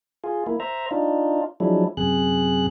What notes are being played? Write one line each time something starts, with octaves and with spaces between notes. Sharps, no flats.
F4 G#4
A#3 E4
C5 E5 A#5
D4 D#4 F4
F3 F#3 G#3 D4 E4
F#2 C3 G#4 F#6